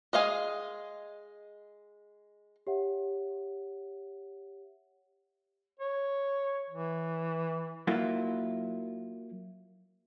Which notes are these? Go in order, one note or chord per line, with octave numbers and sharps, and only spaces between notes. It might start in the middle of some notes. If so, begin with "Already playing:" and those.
G#3 D#5 F5 G#5
G4 C#5 E5 F#5
C#5
E3
F#3 A#3 E4 F4